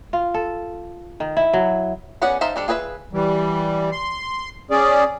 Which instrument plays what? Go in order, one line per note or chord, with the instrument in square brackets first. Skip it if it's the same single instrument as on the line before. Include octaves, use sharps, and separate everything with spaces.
[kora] F4
A4
D#3
E4
F#3
[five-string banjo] B3 C#4 G#4 D5 F#5
D#4 C5 E5 F5 A5
G3 D4 A4
F4 G#4 B4 D5 E5
[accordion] E3 G3
C6
C#4 G#4 D5